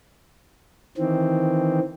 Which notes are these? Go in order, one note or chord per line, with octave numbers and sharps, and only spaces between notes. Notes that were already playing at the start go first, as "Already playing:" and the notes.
D#3 E3 C4